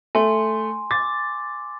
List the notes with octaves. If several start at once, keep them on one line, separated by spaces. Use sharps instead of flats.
A3 G#5 C6
D6 A6